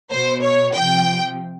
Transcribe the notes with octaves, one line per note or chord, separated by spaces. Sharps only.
B2 C5
C#5
C3 F3 G5